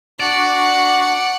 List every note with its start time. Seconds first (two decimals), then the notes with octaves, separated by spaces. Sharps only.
0.20 D4 F#4 D5 F#5